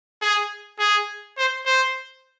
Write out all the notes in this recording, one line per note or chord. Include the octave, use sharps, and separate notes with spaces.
G#4
G#4
C5
C5